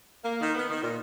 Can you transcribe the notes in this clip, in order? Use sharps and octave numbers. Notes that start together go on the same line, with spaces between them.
A#3
D#3
B3
D#3
A#2